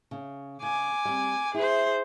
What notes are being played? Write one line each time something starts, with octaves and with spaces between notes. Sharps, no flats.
C#3
C#3 G#5 D6
G3 C4
E4 G#4 C5